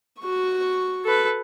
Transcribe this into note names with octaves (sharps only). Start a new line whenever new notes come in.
F#4 C#6
A4 B4